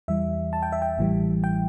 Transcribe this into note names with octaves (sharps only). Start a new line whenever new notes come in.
E2 E3 G3 E5
A5
G5
E5
G5
A1 A2 E3 G3
G5